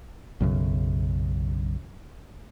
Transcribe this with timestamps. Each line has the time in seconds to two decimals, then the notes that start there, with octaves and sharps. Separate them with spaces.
0.40 B1 F#2 C#3